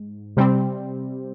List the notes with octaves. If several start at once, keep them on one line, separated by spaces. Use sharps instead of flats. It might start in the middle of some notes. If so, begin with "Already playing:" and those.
Already playing: G#2
C3 G3 C4